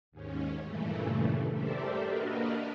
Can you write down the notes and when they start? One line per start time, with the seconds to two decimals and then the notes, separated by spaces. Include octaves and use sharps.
0.12 D#2 G#2 C#4
0.65 G2 A#2 C#3 E3 A3
1.53 G4 A4 A#4 C5 D5 E5
2.05 A#3 D4 F#4 A#4 B4 D#5